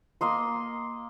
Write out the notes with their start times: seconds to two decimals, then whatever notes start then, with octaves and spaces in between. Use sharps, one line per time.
0.21 A#3 D#5 C6